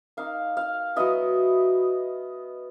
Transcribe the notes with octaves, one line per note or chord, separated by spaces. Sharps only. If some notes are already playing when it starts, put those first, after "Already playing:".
A#3 D#4 F5
F5
F#3 B3 E4 D#5